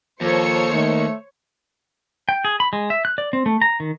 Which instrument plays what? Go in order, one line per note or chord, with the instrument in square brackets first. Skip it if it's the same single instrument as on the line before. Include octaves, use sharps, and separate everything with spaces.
[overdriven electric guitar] D#2 [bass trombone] F3 [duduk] A4 [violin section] C5 C#5 C#7
[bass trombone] D#3 [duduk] A3
[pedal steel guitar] G5
G#4
B5
G#3
E5
F#6
D5
C4
A3
A#5
D#3